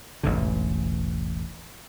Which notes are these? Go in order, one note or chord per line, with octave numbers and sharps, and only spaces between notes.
E1 A1 G#2 D3